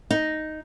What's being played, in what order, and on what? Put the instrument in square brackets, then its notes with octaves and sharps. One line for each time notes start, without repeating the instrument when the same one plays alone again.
[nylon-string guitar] D#4